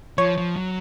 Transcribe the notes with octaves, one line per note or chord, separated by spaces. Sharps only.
F3 C#5
F3
F#3